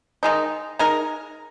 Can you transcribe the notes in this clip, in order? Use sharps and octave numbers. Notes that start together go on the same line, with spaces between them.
D#3 G#3 D#4
G#3 D#4 A#4